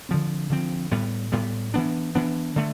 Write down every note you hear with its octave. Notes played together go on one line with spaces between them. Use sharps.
D3 F3 C4
D3 F3 C4
A2 G3 B3
A2 G3 B3
E3 B3 D4
E3 B3 D4
D3 A3